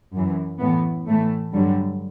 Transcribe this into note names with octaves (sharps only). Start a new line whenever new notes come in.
F#2 E3
A2 E3 B3
A2 E3 A3
G2 D3 F#3 G3